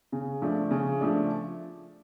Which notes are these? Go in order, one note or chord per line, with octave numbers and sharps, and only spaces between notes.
C#3
F3 A3 D4
C#3
F3 A3 D4